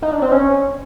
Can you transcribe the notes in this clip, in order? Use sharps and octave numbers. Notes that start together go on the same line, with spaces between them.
D#4
D4
C4
C#4